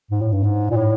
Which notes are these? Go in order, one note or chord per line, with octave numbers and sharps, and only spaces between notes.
G#2
A2
G2
G#2
A#2
A2